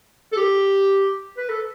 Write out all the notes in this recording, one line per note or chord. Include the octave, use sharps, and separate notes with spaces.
A4
G4
B4
A4